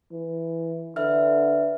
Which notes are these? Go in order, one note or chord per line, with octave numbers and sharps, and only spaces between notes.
E3
D3 B4 E5 F6